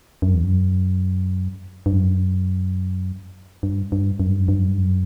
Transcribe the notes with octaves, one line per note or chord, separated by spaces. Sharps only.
F#2
E2
F#2
G2
F#2
G2
G2
F#2
G2
F#2
G2
F#2
G2
F#2